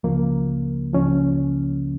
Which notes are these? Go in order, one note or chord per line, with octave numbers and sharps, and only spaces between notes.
C#2 C#3 F3 A#3
C#2 C#3 F3 C#4